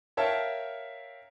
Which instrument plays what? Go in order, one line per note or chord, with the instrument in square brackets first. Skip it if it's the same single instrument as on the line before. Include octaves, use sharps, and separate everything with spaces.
[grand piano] A#4 C#5 E5 F5 G5 A5